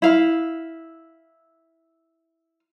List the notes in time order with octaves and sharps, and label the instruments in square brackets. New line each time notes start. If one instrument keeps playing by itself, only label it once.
[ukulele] E4 F5